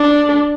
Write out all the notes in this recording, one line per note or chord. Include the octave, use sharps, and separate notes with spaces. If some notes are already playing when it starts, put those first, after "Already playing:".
Already playing: D4